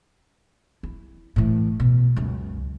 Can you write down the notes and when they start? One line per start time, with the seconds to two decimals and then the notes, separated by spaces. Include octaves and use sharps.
0.83 E4
1.36 A2 E3
1.80 B2
2.16 C#2 F#2